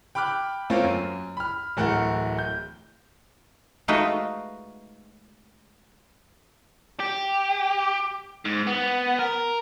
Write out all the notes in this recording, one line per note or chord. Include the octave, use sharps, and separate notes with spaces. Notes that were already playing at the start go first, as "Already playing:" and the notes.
G5 B5 D6 F6 F#6
A3 A#3 C4 C#4 F4 A#4
F#2
B5 F6
D1 E3 A3 A#4 F#5
G6
G#3 A3 D#4 F4 F#4 B4
G4
G#2
B3
A#4